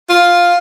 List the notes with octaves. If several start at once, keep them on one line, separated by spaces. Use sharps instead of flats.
F4